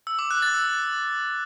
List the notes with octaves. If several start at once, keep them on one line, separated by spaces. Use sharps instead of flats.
E6
D6
F#6
A6
E6